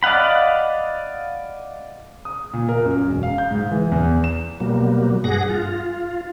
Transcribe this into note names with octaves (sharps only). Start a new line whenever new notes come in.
D5 D#5 F5 F#5 B5
D#6
A#2
A#4
F#2
E1
F5
G6
G#2
E3
E2
E7
B2 F#3 G3 A#3
G2 G#4 F#5 A#6
F4